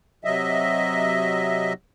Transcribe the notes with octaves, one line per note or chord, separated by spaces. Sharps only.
C3 F#3 D#5 E5